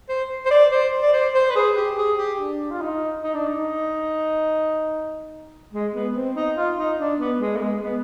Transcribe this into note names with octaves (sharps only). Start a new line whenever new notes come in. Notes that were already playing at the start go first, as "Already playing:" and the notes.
C5
C5
D5
C5
D5
C5
C5
B4
G#4
G4
G#4
G4
D4
F4
D#4
D#4
D4
D#4
G#3
B3
C4
D#4
F4
D#4
D4
B3
G#3
B3
G#3
B3